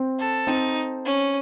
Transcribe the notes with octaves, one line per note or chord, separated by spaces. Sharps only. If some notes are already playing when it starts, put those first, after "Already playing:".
Already playing: C4
A4
C4 D#4
C#4